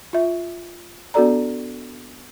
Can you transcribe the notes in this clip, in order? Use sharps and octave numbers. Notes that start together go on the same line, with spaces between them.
F4 E5
B3 D4 F#4 A4 D5 A#5